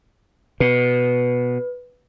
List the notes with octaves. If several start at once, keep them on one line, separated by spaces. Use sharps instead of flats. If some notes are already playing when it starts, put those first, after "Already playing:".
B2 B4